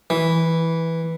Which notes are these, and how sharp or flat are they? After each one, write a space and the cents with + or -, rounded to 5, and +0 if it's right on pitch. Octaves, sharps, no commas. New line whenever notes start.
E3 -5